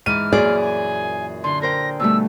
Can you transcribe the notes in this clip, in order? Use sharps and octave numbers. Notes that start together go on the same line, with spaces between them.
G#2 E3 D6 F6 D#7
F#2 A#2 E3 G#4 D5
G#5
D3 C6
A#4 C5 G5 A#6
B2 G3 A3 E6